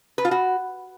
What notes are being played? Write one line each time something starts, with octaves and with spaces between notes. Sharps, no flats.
B4
F4
F#4